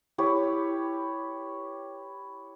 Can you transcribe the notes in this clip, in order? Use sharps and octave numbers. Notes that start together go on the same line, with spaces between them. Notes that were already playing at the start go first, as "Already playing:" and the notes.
E4 G4 B4 C#5